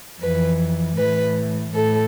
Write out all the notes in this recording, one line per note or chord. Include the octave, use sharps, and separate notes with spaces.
F2 E3 B4
A2 E3 B4
A2 A4